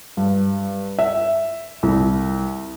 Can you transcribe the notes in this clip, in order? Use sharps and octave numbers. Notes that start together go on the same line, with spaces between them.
G2
E5
C2